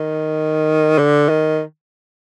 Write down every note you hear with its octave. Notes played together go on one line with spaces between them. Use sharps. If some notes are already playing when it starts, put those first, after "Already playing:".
Already playing: D#3
D3
D#3